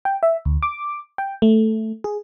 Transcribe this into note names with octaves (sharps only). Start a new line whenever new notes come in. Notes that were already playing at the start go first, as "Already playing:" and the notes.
G5
E5
D2
D6
G5
A3
G#4